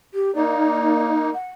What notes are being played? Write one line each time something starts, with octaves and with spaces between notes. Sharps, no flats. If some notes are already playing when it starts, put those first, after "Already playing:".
G4
A#3 D#4 D5
F#5